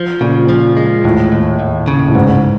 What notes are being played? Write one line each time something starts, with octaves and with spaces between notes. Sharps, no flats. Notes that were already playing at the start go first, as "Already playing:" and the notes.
Already playing: F3
A#2 C#3
F3
G#3
D#2 A2
D#2
D#2
C#3
A2
C2 G#2